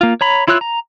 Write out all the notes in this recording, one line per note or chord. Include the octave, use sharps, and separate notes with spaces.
A#3 F4
C#5 A#5 B5
E4 F4 C#5 E6 F#6
A#5